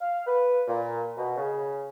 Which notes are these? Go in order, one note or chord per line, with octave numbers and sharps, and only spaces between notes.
F5
B4
A#2
B2
C#3